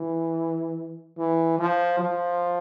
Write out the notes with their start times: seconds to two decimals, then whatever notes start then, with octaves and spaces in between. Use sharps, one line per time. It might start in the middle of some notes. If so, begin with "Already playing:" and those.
Already playing: E3
1.17 E3
1.59 F3
1.99 F3